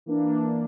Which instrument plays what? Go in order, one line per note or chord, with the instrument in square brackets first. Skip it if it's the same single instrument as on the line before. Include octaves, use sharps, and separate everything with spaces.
[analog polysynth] E3 A#3 D4